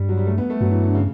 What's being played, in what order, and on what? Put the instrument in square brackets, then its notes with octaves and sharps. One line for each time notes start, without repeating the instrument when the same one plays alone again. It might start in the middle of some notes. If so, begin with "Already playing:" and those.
Already playing: [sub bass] G2 [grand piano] G3
[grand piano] F#3
G3
A3
B3
A3
[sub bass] G2 [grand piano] F#3
[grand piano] E3
D3
C#3